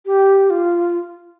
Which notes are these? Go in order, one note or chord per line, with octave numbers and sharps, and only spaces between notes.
G4
F4